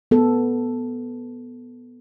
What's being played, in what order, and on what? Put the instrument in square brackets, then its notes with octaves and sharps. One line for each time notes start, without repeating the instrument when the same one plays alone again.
[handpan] B3 A4